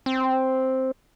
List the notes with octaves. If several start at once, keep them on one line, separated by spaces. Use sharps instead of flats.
C4